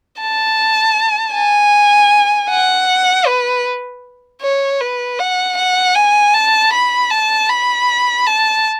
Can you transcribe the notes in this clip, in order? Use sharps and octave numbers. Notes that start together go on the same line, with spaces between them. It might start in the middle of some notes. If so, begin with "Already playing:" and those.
A5
G#5
F#5
B4
C#5
B4
F#5
F#5
G#5
A5
B5
A5
B5
A5